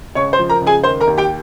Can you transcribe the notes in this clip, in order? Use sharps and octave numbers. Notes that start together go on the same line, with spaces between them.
C#2 C#5 C#6
C5 C6
F3
A#4 A#5
C#2
G#4 G#5
D#3 C5 C6
A#4 A#5
D#2
G4 G5